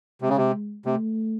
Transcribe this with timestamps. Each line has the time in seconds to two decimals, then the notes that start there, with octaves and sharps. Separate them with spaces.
0.22 C3 G#3
0.29 C#3
0.37 C3
0.86 C3 A3